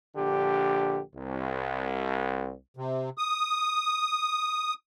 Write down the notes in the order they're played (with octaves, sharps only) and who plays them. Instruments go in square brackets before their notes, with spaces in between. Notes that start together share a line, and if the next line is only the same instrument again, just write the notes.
[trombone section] A#1 D3 G4
C2
[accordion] C3
D#6